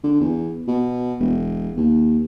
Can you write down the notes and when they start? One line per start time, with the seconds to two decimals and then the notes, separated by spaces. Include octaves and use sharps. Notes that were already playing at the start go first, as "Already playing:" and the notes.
0.04 D3
0.20 E2
0.68 B2
1.20 E1
1.77 D#2